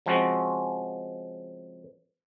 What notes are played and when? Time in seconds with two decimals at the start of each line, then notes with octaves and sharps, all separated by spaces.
0.06 C#3 F3 G#3 C4 F#4